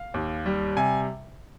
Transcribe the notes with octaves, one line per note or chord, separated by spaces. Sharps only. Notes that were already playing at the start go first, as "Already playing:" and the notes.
Already playing: F5
D#2
G3
C3 G#5